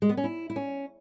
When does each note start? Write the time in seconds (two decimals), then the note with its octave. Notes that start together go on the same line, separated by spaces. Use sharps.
0.02 G#3
0.09 B3
0.17 C#4
0.24 E4
0.50 E4
0.56 C#4